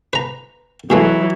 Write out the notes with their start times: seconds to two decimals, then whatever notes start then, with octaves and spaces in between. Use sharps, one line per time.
0.13 B4 A#5
0.90 B2 E3 F#3 G#3 A3